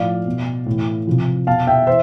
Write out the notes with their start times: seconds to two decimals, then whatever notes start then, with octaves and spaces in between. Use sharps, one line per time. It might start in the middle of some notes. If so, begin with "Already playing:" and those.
Already playing: A2 F3 D5 F5
0.26 B2
0.66 A2 E3
1.07 C3 F3
1.47 B2 F5 A5
1.67 E5 G5
1.87 E3 C5 E5